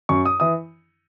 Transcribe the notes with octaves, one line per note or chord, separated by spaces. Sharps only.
F#2 C#6
D#6
E3 D#6